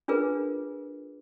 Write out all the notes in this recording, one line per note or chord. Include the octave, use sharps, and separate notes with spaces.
D4 F4 G#4 A#4 B4